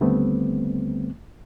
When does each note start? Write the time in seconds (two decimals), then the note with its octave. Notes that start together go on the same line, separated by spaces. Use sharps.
0.01 D#2 D3 G3 A3 B3 C4